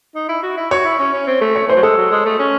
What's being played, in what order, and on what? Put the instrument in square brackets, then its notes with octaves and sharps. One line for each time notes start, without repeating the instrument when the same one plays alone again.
[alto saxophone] D#4
E4
F#4
E4
[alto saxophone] F#4 [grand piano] C#5
[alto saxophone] E4
C#4
C#4
C4
A3
[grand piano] C#5
[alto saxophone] E3 [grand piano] C5
[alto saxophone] F#3
[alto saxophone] G#3 [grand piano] A4
[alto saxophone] F#3
G#3
A3
C#4